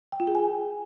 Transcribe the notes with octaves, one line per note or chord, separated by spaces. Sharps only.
G5
F4
G#4
G#5